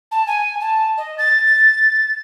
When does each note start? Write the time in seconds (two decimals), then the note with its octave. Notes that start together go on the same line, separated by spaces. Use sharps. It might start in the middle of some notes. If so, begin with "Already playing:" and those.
0.12 A5
0.27 G#5
0.60 A5
0.98 D#5
1.18 A6